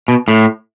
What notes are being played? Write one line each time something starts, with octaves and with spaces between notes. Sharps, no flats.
B2
A2